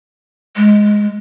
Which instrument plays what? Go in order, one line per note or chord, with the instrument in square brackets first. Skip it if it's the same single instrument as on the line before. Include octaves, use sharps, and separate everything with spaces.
[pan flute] G#3